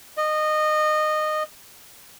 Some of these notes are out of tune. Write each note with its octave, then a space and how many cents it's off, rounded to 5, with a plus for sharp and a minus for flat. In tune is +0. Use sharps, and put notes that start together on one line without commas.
D#5 -20